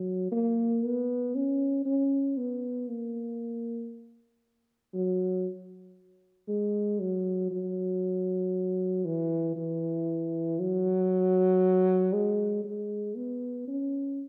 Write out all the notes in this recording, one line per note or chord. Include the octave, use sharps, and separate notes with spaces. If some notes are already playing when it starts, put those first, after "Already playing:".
Already playing: F#3
A#3
B3
C#4
C#4
B3
A#3
F#3
G#3
F#3
F#3
E3
E3
F#3
G#3
G#3
B3
C#4